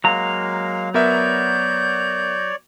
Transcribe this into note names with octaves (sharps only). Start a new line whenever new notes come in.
F#3 G#3 A#3 F5 A#5
B3 A#4 C#5 D5 E5 G6